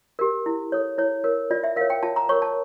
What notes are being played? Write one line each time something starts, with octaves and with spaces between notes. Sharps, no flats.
G4 A#4
E4
A4 C#5
E4 C#5
A#4 C#5
F4 D5
E5
A#4 C#5 F5
G5
F4 A5
A#5
A#4 C#5 C#6
A5